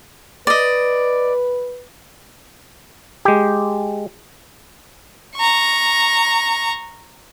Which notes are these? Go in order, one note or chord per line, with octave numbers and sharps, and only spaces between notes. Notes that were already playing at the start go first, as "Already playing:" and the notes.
B4 D5 D#5
G#3 G4
A#5 C#6